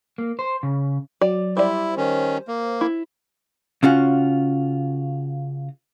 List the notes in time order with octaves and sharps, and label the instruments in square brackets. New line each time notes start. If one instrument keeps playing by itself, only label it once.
[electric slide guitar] A#3
C5
C#3
[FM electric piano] F#3 [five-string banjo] D5
[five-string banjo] G3 D5 [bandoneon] E4 [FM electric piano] C5
[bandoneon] D#3 C#4
A#3
[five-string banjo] E4
[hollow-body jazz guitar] C#3 C#4 F4 F#4